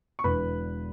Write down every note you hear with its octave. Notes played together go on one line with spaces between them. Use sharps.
C#6
E1 E2 D3 B4 B5